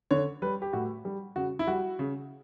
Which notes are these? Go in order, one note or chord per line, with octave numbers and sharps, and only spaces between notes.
D3 C#5
G3 B4
G4
A2 F#4
G3
C#3 F#4
E4
G3 F#4
C#3